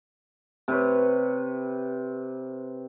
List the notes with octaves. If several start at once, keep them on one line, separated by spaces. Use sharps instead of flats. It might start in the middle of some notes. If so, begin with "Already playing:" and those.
C3 B4 C#5